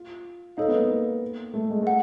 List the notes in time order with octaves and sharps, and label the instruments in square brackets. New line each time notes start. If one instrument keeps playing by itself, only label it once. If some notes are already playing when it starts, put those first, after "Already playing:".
Already playing: [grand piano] F4
[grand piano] D#4 [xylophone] A4 C#5 F5
[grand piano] B3
A#3
A3
G#3
[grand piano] A3 [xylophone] F#5